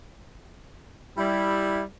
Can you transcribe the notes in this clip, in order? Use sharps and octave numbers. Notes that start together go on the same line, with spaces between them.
G3 E4